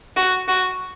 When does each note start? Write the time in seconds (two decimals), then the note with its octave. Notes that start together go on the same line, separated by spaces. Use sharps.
0.17 F#4
0.48 F#4